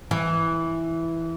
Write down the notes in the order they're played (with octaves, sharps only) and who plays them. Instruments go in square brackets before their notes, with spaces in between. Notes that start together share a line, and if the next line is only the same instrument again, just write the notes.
[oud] E3